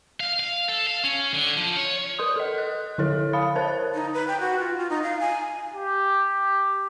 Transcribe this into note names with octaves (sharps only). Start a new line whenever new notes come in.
F5
F5
A4
F5
C#4
D3
F3
C#5
A#4 B4 C6 D#6
A4 D#5
F#6
D3 E4 A4 C#5
F5 B5 D#6 A6
A#4 C5 C#5 A5 F#6 A6
D#4
B4
G5
F#4
F4
F4
D#4
F5
G#5
G4